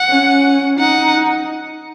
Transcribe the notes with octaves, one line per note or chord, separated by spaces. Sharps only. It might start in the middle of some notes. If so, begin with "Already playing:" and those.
Already playing: F#5
C#4
D#4 F#5